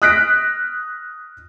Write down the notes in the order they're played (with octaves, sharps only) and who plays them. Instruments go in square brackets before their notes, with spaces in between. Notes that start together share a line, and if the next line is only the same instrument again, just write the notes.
[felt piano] D#6 F6 F#6 A#6 B6 D7